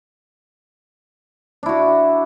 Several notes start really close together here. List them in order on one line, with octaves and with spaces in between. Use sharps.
D4 E4 F#4